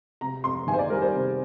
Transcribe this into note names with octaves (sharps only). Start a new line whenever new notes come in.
C3 A#5
F2 C6
D#3 G#5
C5
D5
G3 A#4
C5
C3